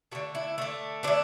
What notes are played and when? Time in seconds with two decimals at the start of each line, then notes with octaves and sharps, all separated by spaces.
0.12 D3 A3 F#4
0.35 E4
0.58 D3 A3
1.03 D3 A3 D4